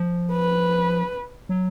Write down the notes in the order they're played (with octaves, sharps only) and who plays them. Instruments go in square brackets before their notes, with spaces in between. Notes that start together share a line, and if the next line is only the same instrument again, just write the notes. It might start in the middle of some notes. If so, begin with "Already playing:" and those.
Already playing: [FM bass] F3
[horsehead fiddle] B4
[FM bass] F#3